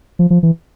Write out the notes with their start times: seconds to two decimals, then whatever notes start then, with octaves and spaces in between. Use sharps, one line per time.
0.19 F3
0.30 F3
0.43 E3